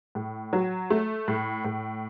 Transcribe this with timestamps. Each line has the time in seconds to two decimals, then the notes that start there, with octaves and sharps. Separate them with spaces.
0.15 A2
0.53 F#3
0.90 A3
1.28 A2
1.65 A2